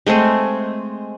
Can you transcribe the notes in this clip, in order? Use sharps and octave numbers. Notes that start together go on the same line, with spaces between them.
G#3 A3 C4 G#4